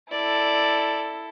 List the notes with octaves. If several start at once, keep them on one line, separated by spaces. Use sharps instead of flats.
E4 A4 D5